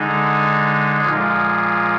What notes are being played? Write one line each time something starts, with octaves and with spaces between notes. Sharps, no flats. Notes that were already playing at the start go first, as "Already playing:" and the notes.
Already playing: D3 G#3 D#4
A#2 F3 G#3